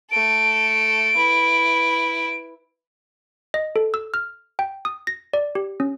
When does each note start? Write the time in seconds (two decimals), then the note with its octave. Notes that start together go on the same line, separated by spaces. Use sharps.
0.11 A3 A4 D7
1.17 E4 B4
3.54 D#5
3.76 A4
3.94 E6
4.14 F6
4.59 G5
4.85 D#6
5.07 A#6
5.33 D5
5.55 G4
5.80 C#4